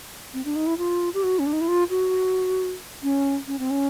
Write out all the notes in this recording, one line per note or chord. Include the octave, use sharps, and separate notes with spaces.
C4
D4
D#4
E4
F4
G4
F#4
C#4
D4
D#4
E4
F4
F#4
C#4
C#4
C4
C#4